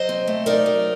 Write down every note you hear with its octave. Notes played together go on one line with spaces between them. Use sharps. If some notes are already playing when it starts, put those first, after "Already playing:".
Already playing: F#3 C5 D#5
C4
A3
D#4 A#4 D5
F#3